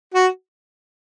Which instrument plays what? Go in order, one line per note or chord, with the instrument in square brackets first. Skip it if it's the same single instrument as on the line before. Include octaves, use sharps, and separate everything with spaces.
[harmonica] F#4